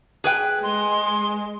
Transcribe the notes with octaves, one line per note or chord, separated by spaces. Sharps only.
G#4 B4 G5 F#6
G#3 C6